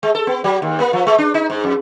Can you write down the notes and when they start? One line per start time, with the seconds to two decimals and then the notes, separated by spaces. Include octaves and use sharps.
0.03 G#3
0.15 A4
0.27 B3
0.44 F#3
0.62 D#2
0.80 A#3
0.93 F3
1.07 G#3
1.18 D4
1.34 D#4
1.50 G#2
1.64 F2